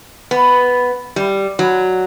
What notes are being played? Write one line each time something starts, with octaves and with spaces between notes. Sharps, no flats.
B3
G3
F#3